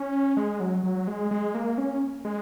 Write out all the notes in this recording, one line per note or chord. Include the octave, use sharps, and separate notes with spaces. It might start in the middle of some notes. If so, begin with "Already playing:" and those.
Already playing: C#4
G#3
F#3
F#3
G#3
G#3
A#3
C#4
G#3